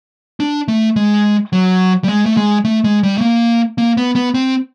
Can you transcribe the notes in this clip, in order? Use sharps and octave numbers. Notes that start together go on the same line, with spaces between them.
D4
A3
G#3
F#3
G3
G#3
A3
G#3
A3
G#3
G3
A3
A#3
A#3
B3
B3
C4